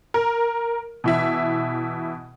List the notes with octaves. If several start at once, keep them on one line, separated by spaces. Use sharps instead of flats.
A#4
B2 E3 E5